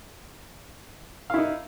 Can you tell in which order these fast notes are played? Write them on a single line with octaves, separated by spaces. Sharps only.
F5 E4 D#4